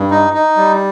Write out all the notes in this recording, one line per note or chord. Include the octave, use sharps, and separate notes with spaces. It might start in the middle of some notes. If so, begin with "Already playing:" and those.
Already playing: G2
D#4
D#4
G3